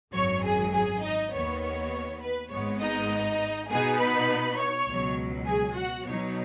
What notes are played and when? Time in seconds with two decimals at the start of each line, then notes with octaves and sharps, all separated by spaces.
0.14 G#1 F#2 F#3 C#5 C#6
0.44 G#4 G#5
0.74 G#4 G#5
1.03 D#4 D#5
1.33 D#2 D#3 B3 C#5
1.62 C#5
2.22 B4
2.51 G#1 G#2 G#3 B3 C#5
2.81 D#4 D#5
3.70 B2 B3 D#4 G#4 G#5
4.00 B4 B5
4.59 C#5 C#6
4.89 C#2 B2 F#3
5.48 G#4 G#5
5.77 F#4 F#5
6.07 B2 F#3 D#4 C#5